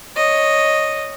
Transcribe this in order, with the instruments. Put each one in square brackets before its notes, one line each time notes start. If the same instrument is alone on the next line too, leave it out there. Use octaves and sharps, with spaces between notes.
[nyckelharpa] C#5 D#5